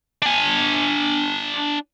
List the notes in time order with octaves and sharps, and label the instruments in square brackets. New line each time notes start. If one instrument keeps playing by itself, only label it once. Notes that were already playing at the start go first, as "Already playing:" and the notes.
[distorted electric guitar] D4 G#5